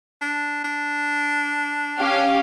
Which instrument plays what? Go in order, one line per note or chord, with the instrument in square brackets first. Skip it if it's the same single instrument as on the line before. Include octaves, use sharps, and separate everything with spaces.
[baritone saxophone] D4
D4
[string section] C#4 G4 F5